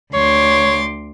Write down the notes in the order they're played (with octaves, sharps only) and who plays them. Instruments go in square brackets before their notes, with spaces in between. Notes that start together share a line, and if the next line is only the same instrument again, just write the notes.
[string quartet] D2 C6 D6 [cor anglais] C#5